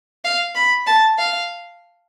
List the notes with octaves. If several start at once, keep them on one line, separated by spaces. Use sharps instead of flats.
F5
B5
A5
F5